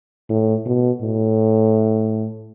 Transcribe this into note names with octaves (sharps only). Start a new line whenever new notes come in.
A2
B2
A2